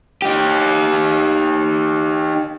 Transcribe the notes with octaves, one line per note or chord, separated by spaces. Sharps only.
D#4 G4